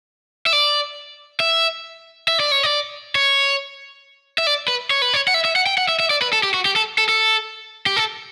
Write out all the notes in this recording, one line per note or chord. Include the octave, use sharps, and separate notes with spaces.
E5
D5
E5
E5
D5
C#5
D5
C#5
E5
D5
B4
C#5
B4
C#5
F#5
E5
E5
F#5
G5
F#5
E5
E5
D5
B4
A4
G4
F#4
G4
A4
A4
A4
G4
A4